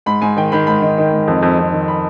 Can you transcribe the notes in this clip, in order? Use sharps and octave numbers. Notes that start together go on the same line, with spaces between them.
G#2 B5
G#2 G#5
D#3 G5
D#3 B5
G#2 B5
D#3
D#3
G#2
F2
F2
F2
D#3
B5